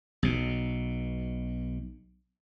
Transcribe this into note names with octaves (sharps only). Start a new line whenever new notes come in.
B1 B2